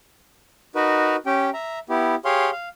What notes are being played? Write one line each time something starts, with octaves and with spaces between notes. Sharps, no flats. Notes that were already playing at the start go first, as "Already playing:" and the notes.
D#4 F#4 A#4 B4
C#4 G4 G5
E5 A#5
B3 E4 G4
G4 G#4 C#5 F5 C6
F5